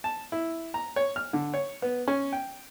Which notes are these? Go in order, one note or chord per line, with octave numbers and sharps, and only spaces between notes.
A5
E4
A#5
C#5
F6
D3
C#5
B3
C#4
G5